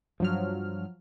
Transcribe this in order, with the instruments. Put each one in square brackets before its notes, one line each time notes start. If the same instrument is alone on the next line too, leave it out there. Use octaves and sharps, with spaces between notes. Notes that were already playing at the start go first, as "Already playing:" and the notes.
[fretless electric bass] G2 [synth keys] F3 F#3 F6